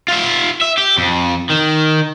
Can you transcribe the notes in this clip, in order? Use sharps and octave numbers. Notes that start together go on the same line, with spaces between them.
F4 E5
E5
G4
F2
D#3